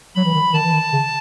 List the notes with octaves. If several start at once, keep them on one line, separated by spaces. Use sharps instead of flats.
F#3 B5
E3
D#3
D#3 A5
E3
D#3
C#3